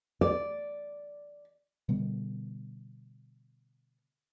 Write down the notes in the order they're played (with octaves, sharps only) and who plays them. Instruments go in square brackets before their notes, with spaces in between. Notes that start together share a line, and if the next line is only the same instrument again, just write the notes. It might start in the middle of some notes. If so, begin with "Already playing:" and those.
[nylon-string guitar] D5
[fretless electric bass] B2 D3 G3 B3